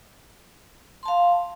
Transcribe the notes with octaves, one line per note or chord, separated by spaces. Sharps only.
F5 A5 C6